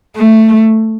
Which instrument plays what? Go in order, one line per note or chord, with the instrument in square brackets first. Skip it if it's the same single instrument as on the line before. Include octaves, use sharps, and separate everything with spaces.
[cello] A3